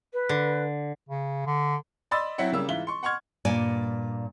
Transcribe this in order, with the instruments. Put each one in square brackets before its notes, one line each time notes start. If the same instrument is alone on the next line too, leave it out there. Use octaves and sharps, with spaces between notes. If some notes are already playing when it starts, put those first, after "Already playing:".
[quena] B4
[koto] D3
[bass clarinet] C#3
D3
[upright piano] D5 D#5 B5 C6 E6 A6
F#3 C4 E4 E5 F#5
C#3 G3 A#3 E6
G#2 E3 F4 E5 G7
C6 C#6
F#5 C6 C#6 F6 G#6
[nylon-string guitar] G2 A#2 D5 G#5